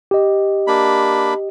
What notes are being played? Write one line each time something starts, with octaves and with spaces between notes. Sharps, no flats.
G4 D#5
A#3 D4 B5